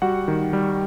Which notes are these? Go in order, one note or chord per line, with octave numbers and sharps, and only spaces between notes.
G3 F#4 F#5
D#3
G3